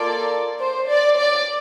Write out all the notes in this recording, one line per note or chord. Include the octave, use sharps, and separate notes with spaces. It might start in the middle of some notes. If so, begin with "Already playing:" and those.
Already playing: A#3 F4 A4 D5
C5
D5
D5